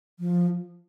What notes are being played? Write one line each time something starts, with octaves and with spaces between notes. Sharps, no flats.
F3